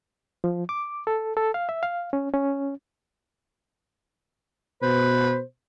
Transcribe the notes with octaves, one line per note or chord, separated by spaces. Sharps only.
F3
D6
A4
A4
F5
E5
F5
C#4
C#4
B2 B4 C5